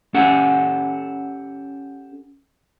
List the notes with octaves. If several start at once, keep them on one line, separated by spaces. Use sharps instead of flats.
C#4 G4 A4 F#5